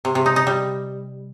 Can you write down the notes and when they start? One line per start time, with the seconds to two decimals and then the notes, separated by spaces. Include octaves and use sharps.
0.05 C3
0.15 C3
0.26 D#4
0.36 D#4
0.47 G3